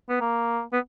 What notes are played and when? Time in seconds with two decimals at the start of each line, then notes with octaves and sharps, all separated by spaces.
0.09 B3
0.21 A#3
0.73 B3